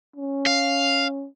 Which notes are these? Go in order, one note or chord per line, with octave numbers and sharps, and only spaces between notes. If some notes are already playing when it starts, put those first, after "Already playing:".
C#4
F5